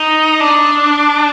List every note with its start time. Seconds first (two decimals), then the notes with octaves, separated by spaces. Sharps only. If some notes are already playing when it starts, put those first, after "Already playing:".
Already playing: D#4
0.40 D4